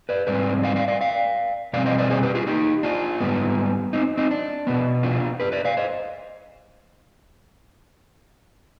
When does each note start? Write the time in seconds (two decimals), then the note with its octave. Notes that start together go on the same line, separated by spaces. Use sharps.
0.09 B4 D5
0.27 G#2 G3 C4 B4 D5
0.63 D5 F5
0.76 D5 F5
0.88 D5 F5
1.01 D5 F5
1.73 B2 G3 C4 D5 F5
1.86 C5 D#5
1.98 B4 D5
2.10 G#4 C5
2.23 G4 B4
2.35 F4 G#4
2.47 D#4 G4
2.83 D4 F4
3.20 G#2 G3 B3
3.93 C4 D#4
4.17 C4 D#4
4.31 D4
4.67 B2 B3
5.03 D4 F4
5.40 G4 B4
5.52 B4 D5
5.65 D5 F5
5.77 C5 D#5